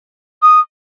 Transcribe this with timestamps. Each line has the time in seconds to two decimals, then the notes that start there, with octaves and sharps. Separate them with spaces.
0.42 D#6